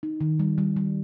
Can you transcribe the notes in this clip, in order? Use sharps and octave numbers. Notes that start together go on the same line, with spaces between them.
D#4
D#3
G3
G3
G3